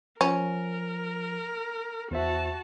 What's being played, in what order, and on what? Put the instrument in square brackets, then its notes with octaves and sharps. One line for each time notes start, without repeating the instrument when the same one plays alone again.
[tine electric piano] F3 [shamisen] C#4 [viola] A#4
[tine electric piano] E2 C5 E5 [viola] F#4 A5